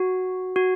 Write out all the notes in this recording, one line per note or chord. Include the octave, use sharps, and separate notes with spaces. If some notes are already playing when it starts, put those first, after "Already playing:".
Already playing: F#4
F#4